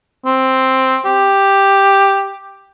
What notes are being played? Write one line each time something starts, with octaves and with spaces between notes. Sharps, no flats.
C4
G4